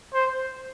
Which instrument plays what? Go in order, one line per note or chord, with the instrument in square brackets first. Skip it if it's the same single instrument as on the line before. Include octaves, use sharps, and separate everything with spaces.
[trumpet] C5